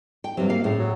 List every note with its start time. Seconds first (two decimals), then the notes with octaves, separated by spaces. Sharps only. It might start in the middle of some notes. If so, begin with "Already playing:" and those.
0.24 G5
0.37 G2 C3 F#3
0.49 A#3 F5
0.64 A2 C#3
0.79 F#3